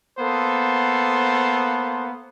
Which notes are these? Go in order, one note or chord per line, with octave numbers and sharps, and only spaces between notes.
A#3 B3 A4 C5